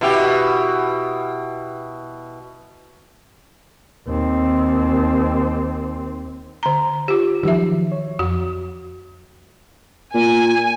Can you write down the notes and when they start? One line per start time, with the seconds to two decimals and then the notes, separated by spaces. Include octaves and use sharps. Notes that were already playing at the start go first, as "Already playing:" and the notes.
0.01 B2 E4 G4
4.07 D#2 C4
6.63 D3 A#5
7.08 F4 G4
7.43 D#3 F3 F#3 G4 E5
7.92 C#5
8.19 F2 F#4
10.14 A#2 G#5